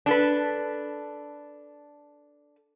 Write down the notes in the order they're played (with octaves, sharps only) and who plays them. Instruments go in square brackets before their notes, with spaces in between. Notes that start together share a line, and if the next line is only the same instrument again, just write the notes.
[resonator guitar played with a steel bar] D4 A4 B4